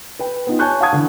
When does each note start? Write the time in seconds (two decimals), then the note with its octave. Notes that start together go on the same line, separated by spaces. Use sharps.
0.19 B4 G5
0.47 B3 D#4 F4
0.59 C#5 G#5 A5 C#6 F#6 G6
0.81 F5 F#5 A5 C#6 D#6 G#6
0.93 D3 E3